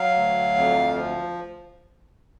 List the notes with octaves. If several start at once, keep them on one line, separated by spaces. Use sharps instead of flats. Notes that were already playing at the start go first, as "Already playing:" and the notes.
Already playing: F#3 F5
D2
F2
F3